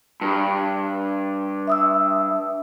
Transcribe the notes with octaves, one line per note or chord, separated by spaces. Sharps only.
G2
E5 D#6 E6